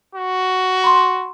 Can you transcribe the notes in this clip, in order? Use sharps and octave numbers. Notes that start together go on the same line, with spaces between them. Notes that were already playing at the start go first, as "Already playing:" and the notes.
F#4
B5 C6